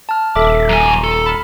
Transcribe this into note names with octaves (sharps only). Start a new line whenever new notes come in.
A5 F6
D#1 A4 E5 D6
F#2 G#5 A#5
A4
B5 F6